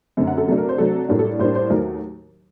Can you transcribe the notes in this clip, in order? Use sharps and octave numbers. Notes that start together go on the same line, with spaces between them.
F#2 D3 A3 C4
F#5
A4
C3 F#3 A3 D4 A4
A#4
C5
C3 F#3 A3 D4 A4
A2 G3 A#3 D4 A4
A4
A2 G3 A#3 D4 C5
C5
D#2 D#3 F#3 A3 A#4